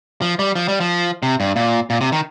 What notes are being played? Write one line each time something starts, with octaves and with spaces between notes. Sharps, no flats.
F3
G3
F3
G3
F3
C3
G2
A#2
A#2
C3
D#3